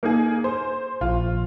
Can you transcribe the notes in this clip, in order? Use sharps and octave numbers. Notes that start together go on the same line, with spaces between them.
A#3 D#4 G#4
C5
A#1 F4